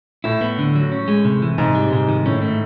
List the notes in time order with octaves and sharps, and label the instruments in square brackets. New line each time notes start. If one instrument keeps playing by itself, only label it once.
[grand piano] A2 [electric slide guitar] E4
[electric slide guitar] B3
D3
F#3
C#4
G#3
C3
E3
[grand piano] G#2 [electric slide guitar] C3
[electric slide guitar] G3
[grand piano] G#2 [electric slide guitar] C3
[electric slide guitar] D#3
[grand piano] A2 [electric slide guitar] C#4
[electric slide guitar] A3